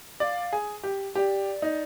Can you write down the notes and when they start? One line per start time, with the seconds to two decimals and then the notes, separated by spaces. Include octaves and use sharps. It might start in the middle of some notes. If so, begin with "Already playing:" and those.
0.20 D5 F5
0.53 G#4
0.83 G4
1.15 G4 D5
1.62 D#4